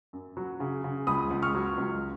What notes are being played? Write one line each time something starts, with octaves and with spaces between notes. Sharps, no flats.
F#2
F#3
C#3
C#3
C#2 B5 D#6
C#2
C#6 F6
F#3
C#2